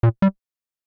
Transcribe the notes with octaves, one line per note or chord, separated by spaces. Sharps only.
A#2
G3